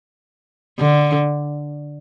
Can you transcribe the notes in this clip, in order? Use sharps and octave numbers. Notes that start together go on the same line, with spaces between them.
D3